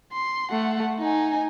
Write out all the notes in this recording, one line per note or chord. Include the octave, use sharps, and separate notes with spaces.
C6
A3 F#5
D#4 G#5